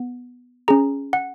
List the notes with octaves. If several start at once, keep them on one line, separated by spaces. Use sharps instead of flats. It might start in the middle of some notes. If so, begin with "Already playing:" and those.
Already playing: B3
C#4 G#4 A#5
F#5